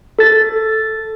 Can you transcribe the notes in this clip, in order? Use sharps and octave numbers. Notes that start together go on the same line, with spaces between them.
A4 A6